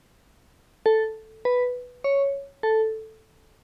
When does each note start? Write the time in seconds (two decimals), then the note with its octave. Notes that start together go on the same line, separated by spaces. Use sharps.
0.86 A4
1.45 B4
2.04 C#5
2.63 A4